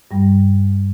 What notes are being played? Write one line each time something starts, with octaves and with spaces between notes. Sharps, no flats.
G2 G3